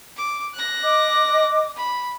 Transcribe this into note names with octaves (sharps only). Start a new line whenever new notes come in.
D6
F#6 A#6
D#5 D6
B5